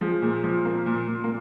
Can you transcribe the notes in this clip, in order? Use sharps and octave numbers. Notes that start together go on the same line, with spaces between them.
F3 G#3
A#2
F3
A#2 A#3
A#2
A#2
A#3